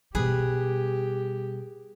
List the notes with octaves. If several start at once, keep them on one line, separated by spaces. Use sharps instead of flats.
B2 G3 G4 G#4 B4